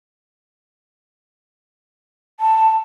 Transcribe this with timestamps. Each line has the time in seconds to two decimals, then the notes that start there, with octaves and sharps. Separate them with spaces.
2.40 A5